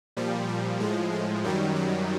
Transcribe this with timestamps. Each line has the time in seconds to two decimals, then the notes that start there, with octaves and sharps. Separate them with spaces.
0.17 A#2 F3 G3
0.48 G3
0.80 A2 F3 G#3
1.12 G#3
1.44 F#2 D#3 F#3 G3
1.76 F#3